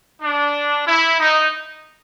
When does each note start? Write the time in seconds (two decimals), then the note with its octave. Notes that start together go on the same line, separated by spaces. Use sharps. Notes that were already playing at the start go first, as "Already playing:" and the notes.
0.22 D4
0.86 E4
1.19 D#4